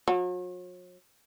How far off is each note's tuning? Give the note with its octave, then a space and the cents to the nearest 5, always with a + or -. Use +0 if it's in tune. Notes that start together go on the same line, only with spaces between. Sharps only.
F#3 -45